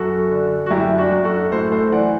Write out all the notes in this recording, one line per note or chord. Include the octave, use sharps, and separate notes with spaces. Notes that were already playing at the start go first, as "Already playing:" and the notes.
Already playing: F#2 F#4 A4
D3
F#4
F#2 E4 G4
D4 F#4
F#2
F#4 A4
A2 A4 C5
A4 C5
E3 D5 F#5